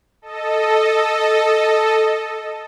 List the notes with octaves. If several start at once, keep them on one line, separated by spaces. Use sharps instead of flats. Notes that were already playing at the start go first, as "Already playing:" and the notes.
A4 D#5